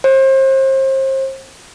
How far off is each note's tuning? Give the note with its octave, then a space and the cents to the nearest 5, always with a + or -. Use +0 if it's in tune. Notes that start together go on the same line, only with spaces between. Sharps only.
C5 +35